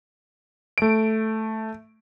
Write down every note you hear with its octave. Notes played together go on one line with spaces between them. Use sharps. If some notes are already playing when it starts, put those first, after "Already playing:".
A3 D7